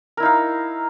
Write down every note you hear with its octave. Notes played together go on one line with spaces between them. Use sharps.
D#4 E4 A#4 F5